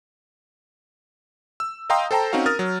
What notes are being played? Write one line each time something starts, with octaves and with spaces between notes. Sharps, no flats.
E6
D#5 F5 G5 A#5 C6 D#6
A4 C5 G5 A5 A#5
C4 C#4 D#4 F#4 F5
A#4 D#6 F6 A6
F#3